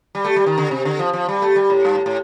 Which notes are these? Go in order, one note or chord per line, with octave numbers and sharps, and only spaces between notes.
G3
A3
G3
D#3
D3
C3
D3
F3
F3
G3
A3
G3
A2
G2
A2
A2